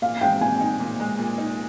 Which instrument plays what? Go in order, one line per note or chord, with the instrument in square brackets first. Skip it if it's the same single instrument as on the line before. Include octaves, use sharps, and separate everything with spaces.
[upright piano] A#2 [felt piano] F5
[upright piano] G#3 [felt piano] G5
[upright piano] A#2 [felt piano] G#5
[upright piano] D#4
A#2
G#3
A#2
D#4